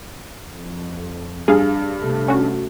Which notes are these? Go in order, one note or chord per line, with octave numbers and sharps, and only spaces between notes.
F2
G2 G#4 F5
C3 A3
C#4 F#4